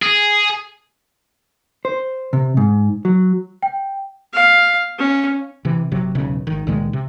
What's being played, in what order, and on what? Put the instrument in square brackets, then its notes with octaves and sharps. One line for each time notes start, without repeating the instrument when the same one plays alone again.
[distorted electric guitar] G#4
[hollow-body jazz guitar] C5
C3
G#2
F#3
[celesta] G5
[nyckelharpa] F5
C#4
[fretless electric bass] C3 E3
F#1 C3 F#3
E1 B1 C#3
G#1 D#3
C#2 A#2 D#3 G#3
C3